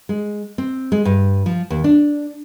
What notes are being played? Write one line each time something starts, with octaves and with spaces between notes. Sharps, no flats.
G#3
C4
G#3
G2
F3
D#2
D4